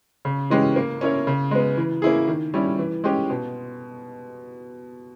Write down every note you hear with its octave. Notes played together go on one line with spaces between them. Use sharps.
C#3
E3 G#3 C#4 G4
A#3
C#4 E4 A#4 C#5
C#3
G#3 B3
E3
A#3 C#4 E4 G#4
D#3
G3 C#4 E4
E3
G#3 C#4 G4
B2